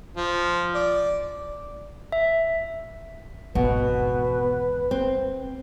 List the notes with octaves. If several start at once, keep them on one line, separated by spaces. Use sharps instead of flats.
F3
D5
E5
G#1 E2 B2 B4
C4